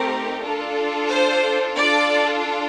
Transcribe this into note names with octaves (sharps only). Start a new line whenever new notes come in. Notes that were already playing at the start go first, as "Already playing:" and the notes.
Already playing: A3 C4 D#4 G4 A#4
D4 F4 A4
C5
D4 F4 A4 D5